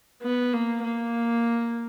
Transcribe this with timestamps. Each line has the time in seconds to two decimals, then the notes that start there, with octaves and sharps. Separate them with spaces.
0.22 B3
0.53 A#3
0.83 A#3